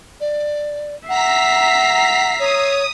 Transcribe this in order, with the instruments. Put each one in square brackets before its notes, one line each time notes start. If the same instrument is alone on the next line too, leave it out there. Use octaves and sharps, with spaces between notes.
[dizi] D5
[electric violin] E5 C7 [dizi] F#5 [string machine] A#5 B6
[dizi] C#5 [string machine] D#6